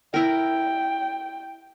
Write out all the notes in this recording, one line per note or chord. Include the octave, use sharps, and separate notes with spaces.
E4 A#4 G5